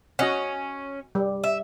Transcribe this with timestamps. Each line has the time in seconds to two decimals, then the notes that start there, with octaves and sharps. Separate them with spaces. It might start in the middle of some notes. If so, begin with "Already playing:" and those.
0.19 C#4 F#4 D#5 F#5
1.15 G3
1.44 E5